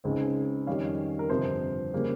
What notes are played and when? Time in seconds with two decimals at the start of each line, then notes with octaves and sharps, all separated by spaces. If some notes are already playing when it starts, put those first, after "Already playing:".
0.04 C#2 C#3 G#3 C4 D#4
0.67 F2 D#3 G3 C#4 F5
1.19 A#4
1.29 G1 F2 C3 F3 C5
1.93 C#3 G3 A#3